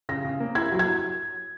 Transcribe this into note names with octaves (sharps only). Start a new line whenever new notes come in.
C#3 A#6
C#3
A#3
E4 G#6
F#3
G#6